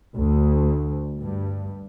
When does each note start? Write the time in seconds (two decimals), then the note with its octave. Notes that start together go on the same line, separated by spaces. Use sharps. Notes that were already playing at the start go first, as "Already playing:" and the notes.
0.16 D2
1.21 G2